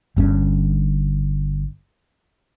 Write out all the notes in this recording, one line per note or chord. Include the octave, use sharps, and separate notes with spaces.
G1 G2 C#4